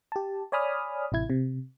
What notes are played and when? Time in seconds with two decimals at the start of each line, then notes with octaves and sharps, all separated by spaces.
0.12 G4 A5
0.52 C#5 D5 G#5 B5 D#6 F6
1.12 A1 C3 E4 G#6
1.30 C3